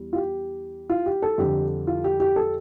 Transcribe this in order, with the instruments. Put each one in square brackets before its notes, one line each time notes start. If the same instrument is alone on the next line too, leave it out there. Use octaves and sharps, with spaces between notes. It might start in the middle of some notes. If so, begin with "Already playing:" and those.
Already playing: [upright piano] E2 G3
F4
G4
F4
G4
A4
F2 D3 G3 G4
F4
G4
G4
A4